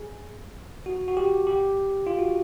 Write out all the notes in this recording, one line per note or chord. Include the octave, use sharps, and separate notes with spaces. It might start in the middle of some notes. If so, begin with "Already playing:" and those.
Already playing: G#4
F#4
F#4
G4
G4
F4
F#4